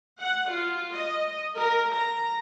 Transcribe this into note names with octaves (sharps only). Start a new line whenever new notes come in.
F#5
F4
D#5
A#4
A#5